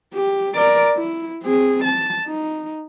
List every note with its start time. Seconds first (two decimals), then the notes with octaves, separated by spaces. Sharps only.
0.14 G4
0.55 A#4 D5
0.96 E4
1.43 C4 G#4
1.84 A5
2.27 D#4